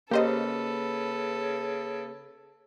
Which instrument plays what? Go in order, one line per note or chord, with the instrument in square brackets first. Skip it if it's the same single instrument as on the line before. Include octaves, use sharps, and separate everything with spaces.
[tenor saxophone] C#3 [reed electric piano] A#3 [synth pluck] G4 C5 D#5 [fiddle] A4 B4